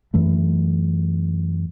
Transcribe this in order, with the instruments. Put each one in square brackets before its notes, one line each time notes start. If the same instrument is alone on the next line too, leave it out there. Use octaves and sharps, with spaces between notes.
[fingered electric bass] F#2 E3 A3